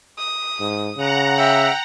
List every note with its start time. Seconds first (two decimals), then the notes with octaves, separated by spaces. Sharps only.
0.18 D#6
0.60 G#2
0.97 C#3 F#5 A#5
1.38 E5 G5